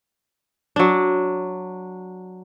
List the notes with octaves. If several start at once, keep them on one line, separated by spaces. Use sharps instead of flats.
F#3 D4